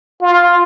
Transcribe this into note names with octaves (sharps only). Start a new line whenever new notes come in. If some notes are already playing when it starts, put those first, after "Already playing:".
F4